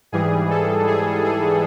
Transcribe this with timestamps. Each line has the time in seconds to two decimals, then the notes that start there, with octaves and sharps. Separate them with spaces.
0.12 G#2 E3 G3 G#4
0.51 A4
0.88 G#4
1.25 G#4